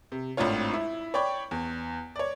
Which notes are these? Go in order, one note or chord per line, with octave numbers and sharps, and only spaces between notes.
C3
G#1 A2 C4 D4 F4 C#5
E4
C#5 D5 G5 B5 C#6
E2
C#5 D5